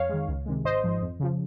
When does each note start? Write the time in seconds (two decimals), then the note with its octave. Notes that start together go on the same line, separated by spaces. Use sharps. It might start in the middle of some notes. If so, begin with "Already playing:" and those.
Already playing: F2 C#5 F5
0.09 D#3 G#3
0.28 C#2
0.46 C3 D#3 G#3
0.64 G#1 C5 D#5
0.84 G#2 F3
1.01 F2
1.20 C#3 F3